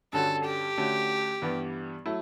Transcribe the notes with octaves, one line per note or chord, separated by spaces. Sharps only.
G2 D3 G3 C#4 F#4 A4
G4
D3 A3 C#4 F#4
G2 E3 G3 B3
F#3 A3 E4